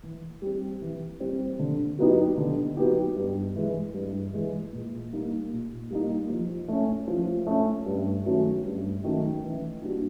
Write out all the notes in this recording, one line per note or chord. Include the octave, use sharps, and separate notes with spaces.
E3
G3 C4
E3
G3 C4
D3
F#3 B3 D#4 G4
D3
F#3 B3 D#4 G4
G2
E3 G#3
G2
E3 G#3
A#2
G3 A#3 D#4
A#2
G3 A#3 D#4
F3
A3 C#4
F3
A3 C#4
G2
D#3 F#3 A3 C#4
G2
D#3 F#3 A3 C#4
E3
G3 A#3 D4 F#4